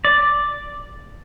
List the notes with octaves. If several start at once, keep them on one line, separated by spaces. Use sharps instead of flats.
D5